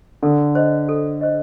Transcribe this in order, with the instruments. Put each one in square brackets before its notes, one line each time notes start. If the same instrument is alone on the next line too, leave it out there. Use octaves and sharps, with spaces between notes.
[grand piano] D3 [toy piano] A4
[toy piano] C5 D#5
A4
C5 D#5